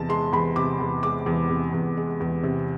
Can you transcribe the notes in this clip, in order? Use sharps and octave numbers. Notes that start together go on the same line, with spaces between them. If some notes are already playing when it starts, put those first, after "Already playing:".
Already playing: E2 C3 A5
G#3 C6
E2 B5
C3 D6
E2
G#3 D6
E2
C3
E2
G#3
E2
C3